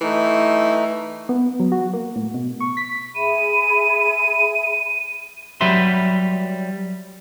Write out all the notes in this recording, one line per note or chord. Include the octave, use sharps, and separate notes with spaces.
E3 A3 D#4
B3
F#3
F#4
A#3
A2
B2
C#6
B6
G#4 E5 B5 D#7
F#3 G3 B4 E5 C6